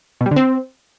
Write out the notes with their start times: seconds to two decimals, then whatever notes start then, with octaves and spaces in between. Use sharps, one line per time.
0.21 B2
0.26 G3
0.31 D3
0.36 C4